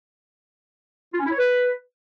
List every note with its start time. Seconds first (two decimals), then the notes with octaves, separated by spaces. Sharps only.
1.13 F4
1.19 C#4
1.25 E4
1.31 C#5
1.38 B4